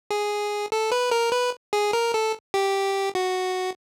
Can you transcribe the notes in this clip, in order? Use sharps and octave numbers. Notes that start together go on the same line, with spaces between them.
G#4
A4
B4
A#4
B4
G#4
A#4
A4
G4
F#4